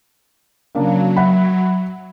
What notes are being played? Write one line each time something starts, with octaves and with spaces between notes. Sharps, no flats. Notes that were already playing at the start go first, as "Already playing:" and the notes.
C#3 F#3 A#3 D4
E5 F#5 B5